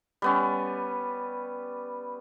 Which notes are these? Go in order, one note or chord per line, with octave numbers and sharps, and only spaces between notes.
G3 B3 C#4